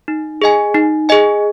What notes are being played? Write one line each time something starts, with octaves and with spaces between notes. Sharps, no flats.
D#4
G#4 D#5 G#5
D#4
G#4 D#5 G#5